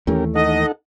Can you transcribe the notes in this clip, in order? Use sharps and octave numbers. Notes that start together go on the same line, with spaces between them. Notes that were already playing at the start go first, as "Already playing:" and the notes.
D#2 E3 A3 C#4 G4 A#4
D#4 A4 D#5 F#5